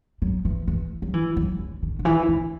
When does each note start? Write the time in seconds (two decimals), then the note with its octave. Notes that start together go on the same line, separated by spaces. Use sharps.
0.22 F#3
0.45 E3
0.68 E3
1.02 F#3
1.14 E3
1.37 F#3
1.59 D3
1.83 D3
1.99 D3
2.05 E3
2.28 D3